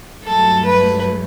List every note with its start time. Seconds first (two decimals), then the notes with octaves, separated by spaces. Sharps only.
0.24 G2 F#3 A3 A4
0.65 B4